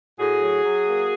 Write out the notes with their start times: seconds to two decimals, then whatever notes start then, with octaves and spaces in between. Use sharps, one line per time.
0.20 A2 F#4 G#4
0.42 F#3
0.65 F#3
0.86 A#3